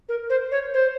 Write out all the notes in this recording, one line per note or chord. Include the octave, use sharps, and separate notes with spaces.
A#4
C5
C#5
C5